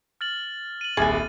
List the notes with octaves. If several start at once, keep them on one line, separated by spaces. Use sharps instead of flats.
F6 A6 F#7
D#7 F#7
D#1 C2 G#4 G#5 A6